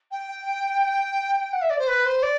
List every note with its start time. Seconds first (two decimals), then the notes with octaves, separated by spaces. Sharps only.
0.11 G5
1.53 F#5
1.62 E5
1.70 D5
1.79 C5
1.88 B4
2.05 C5
2.23 D5